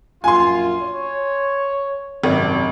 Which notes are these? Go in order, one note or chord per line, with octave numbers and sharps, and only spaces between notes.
A#1 F#2 F4 G#5 C6
C#5
G#1 F#2 C3 D4